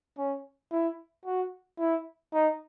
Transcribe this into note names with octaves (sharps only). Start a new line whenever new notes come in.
C#4
E4
F#4
E4
D#4